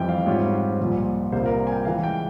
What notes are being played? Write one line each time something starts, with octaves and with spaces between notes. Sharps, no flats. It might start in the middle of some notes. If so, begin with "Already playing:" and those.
Already playing: F2 E3 G3 C4 E4 G5
F5
G#2 G3 C4 F4 C#5
C2 A#2 F3
C2 C3 G3 A#3 F4 C5
A#4
G#5
G5
C#3 E3 G#3 F5
G5